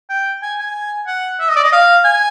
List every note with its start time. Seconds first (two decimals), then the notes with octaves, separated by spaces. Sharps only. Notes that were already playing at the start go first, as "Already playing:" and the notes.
0.09 G5
0.42 G#5
0.59 G#5
1.07 F#5
1.40 E5
1.48 D#5
1.56 D5
1.64 D#5
1.73 F5
2.04 G#5